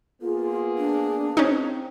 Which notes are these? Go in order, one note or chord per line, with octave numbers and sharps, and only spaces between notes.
A#3 B3 F4 G#4
D4
C4 C#4 D#4